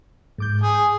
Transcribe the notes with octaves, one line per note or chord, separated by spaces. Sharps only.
G#2 D6 G6
G#4 G#5